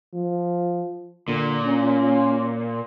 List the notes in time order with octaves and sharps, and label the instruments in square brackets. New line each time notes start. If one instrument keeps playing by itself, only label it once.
[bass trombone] F3
[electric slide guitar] A#2 [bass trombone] D3
[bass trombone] C#4